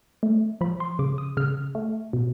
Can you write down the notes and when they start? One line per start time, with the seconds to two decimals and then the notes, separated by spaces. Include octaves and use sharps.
0.23 A3
0.61 F3 B5
0.80 C6
0.99 C#3 D6
1.18 D#6
1.37 C#3 F6
1.75 A3
2.13 B2